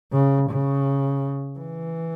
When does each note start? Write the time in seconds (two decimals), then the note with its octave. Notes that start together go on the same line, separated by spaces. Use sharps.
0.13 C#3
0.50 C#3
1.60 E3